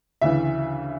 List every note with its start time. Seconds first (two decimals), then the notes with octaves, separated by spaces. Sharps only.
0.21 D2 C#3 E3 E5